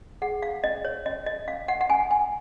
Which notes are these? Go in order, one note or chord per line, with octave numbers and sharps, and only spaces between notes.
G#4 F#5
F5
C#4 D#5
C#5
C#4 D#5
D#5
C#4 F5
F#5
F#5
C#4 G#5
G#5